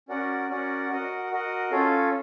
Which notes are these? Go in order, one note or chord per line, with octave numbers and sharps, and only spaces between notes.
C#4 F#4 A#4 D5 F#5
C#4 F#4 A#4 D5 F#5
F#4 A#4 D#5 F#5
F#4 A#4 D#5 F#5
C#4 F4 A4 C#5 F5